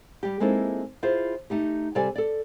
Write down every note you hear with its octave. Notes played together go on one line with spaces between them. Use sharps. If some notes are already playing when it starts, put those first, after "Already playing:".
G3 G4
G#3 A#3 C4 D#4 E4 A4
E4 F4 G#4 C5
A3 D#4 G4
C3 G3 G4 A4 D5 G#5
A4 D5